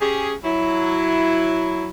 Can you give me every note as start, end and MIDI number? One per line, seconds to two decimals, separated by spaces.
0.01 0.33 61
0.01 0.33 67
0.01 0.33 68
0.44 1.90 54
0.44 1.90 64